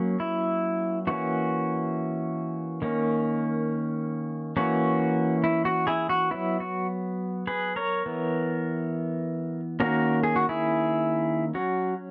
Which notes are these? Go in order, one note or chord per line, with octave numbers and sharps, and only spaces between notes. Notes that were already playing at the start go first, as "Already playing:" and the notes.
Already playing: F#3 A#3 C#4
E4
E3 A#3 C#4 F#4
D#3 A#3 C#4
E3 A#3 C#4 F#4
E4
F#4
E4 G#4
F#4
F#3 B3 E4
F#4
G#4 B4
A#4 C#5
E3 B3
D#3 A#3 C#4 F#4 A#4
G#4
F#4
E4 G#4
F#3 C#4 F#4